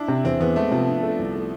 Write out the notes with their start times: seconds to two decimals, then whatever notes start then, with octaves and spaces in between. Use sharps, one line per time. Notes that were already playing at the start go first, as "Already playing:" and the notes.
Already playing: D4 E4
0.08 C3
0.24 E2 C4
0.40 E2 B3
0.56 G#3 A3
0.71 C3 F3
0.88 D4
1.03 A3
1.19 C2
1.35 A3